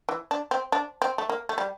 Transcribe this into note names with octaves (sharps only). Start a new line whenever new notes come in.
E3
D4
C4
D4
C4
A3
A#3
A3
G3